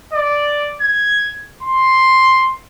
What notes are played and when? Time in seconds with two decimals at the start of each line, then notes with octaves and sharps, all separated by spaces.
0.13 D5
0.81 G#6
1.63 C6